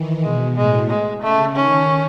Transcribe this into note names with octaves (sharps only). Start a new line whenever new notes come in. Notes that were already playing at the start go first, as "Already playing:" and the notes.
Already playing: D#3 E3
B2 G#3
A2 G#3
G#3
C#3 A3
D#3 C#4